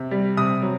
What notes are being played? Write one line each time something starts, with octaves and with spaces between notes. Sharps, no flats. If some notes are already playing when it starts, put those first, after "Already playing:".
Already playing: C3
G3
C3 D#6
F#3